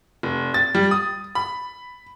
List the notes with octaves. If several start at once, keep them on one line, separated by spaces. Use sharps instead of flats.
F1
A6
G3
D#6
B5